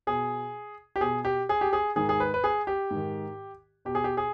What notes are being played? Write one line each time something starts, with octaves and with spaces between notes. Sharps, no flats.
B2 G#4
G4
B2 G#4
G4
G#4
G4
G#4
G#2 D#3 G#4
G#4
B4
B4
G#4
G4
G#2 D#3
B2 G4
G#4
G4
G#4